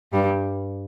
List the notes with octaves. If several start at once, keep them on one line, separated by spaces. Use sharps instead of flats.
G2 G3